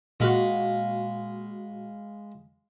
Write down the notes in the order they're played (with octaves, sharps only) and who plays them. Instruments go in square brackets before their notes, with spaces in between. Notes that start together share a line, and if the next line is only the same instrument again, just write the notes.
[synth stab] A#2 F#4 [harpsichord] G#3 F5 B5